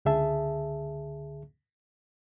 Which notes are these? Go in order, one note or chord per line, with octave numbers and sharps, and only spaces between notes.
C#2 D3 G#4 E5 A5